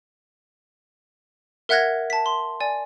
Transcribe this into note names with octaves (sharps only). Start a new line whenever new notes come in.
A#4 E5 F#5 F#6 G#6 A#6
A5 B6
C6
D5 G#5